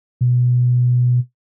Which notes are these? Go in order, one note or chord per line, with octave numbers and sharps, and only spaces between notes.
B2